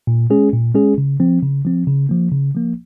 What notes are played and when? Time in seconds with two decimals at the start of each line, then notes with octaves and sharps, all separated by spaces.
0.07 A#2
0.30 G#3 C#4 G#4
0.53 A#2
0.75 G#3 C#4 G#4
0.98 C#3
1.20 F3 C4
1.43 C#3
1.65 F3 C4
1.87 C#3
2.09 F3 A#3
2.32 C#3
2.54 F3 A#3